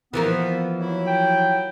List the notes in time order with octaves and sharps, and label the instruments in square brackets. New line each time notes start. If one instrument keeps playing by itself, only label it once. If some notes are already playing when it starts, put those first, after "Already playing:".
[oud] E3 F3 A#3 [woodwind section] B3
[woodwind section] F#3 E4
[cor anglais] G5